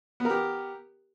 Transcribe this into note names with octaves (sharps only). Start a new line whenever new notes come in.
B3 G4 A#4